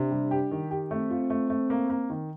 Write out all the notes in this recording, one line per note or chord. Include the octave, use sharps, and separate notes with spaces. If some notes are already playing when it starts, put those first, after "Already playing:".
Already playing: C3 D4
G3
G4
D#3
G4
A3 C4
F4
A3
A3
A#3
A#3
D#3